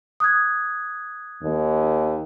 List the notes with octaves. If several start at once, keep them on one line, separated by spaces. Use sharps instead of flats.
D#6 F#6 G#6
D#2